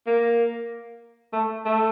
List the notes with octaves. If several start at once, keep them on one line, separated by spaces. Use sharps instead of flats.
A#3
A3
A3